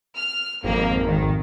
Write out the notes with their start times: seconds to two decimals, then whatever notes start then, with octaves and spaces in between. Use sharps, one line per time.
0.16 F6
0.64 G#1 F2 A#3
1.05 D#3